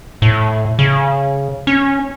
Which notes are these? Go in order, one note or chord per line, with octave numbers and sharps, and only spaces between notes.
A2
C#3
C#4